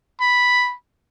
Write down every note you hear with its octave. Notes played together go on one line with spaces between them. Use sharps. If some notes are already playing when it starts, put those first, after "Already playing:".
B5